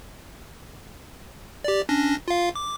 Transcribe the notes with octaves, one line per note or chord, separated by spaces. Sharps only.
G4 D5
C#4 D4 A#6
F4 F5
D6